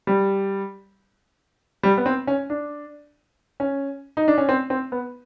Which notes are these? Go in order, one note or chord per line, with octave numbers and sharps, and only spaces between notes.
G3
G3
B3
C4
C#4
D4
C#4
D#4
D4
C#4
C4
C4
B3